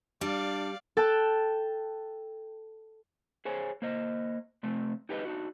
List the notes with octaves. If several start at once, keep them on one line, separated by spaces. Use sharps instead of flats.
G3 D4 D5 F5
A4 G5 A5 F#6
G#4 C5 C#5 G#5
A#3 C5 D#5
C3 A3 C4
D#4 G4 B4 C5 D#5
D4 D#4 F#4